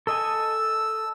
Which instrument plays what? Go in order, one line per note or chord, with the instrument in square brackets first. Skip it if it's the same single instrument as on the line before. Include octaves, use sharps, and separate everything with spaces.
[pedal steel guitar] A4 D#5 G#5 [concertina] E6